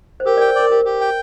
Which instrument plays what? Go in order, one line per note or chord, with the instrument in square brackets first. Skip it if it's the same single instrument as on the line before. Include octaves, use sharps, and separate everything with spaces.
[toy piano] C5
[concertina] G4 [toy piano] A#4
[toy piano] A#4 D5 [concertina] G5
[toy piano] C5
[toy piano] A#4 [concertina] D5
[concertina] G4 [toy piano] A#4
[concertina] G4
G5